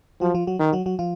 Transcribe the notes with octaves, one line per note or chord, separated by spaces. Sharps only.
F3 F#3 F#4
F3 F4
F#3 F#4
D#3
F#3 F#4
F#3 F#4
F3 F4